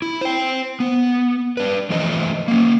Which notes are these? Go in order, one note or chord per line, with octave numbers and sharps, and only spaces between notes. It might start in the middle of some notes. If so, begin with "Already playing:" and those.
E4
C5 G5
B3
D4 B4
E3 F3 A3 C5 D#5
A#3 C#4